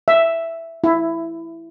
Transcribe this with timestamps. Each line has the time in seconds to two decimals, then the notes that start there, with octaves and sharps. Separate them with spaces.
0.08 E5
0.84 E4